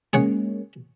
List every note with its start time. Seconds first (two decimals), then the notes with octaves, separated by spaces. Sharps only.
0.13 G#3 A#3 C#4 G#4 C#5 F#5